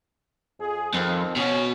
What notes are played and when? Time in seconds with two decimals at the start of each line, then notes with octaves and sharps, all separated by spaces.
0.60 F2 G#4
0.94 F2 D#3 F3 C4
1.36 B2 C#4 F#4